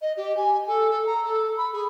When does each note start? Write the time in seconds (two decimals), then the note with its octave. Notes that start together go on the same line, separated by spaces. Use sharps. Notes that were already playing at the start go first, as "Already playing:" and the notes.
0.01 D#5
0.16 G4
0.36 G#5
0.67 A4
0.90 A4
1.06 A#5
1.24 A4
1.57 B5
1.72 G#4